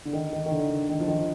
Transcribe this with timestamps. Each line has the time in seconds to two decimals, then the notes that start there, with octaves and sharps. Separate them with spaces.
0.05 D3
0.13 D#3
0.33 D#3
0.46 D#3
0.51 D3
0.70 D3
0.89 D#3
1.00 F3
1.08 D#3